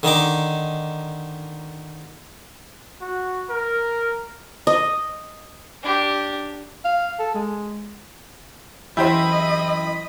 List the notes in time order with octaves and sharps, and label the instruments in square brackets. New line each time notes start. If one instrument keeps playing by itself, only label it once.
[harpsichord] D3 D#3 D#4 D6
[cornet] F#4
A#4
[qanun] D#5
[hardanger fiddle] D4 G4
[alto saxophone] F5
A4
G#3
[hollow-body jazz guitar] F#2 E3 G5 [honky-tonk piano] E4 G4 C5 [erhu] D#5 [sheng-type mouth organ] B5